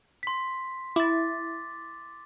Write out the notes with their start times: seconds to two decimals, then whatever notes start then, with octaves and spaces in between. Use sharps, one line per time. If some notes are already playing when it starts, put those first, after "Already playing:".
0.23 C6 B6
0.96 E4 D6 A6